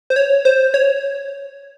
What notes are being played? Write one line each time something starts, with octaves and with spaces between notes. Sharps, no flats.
C5
C#5
C5
C#5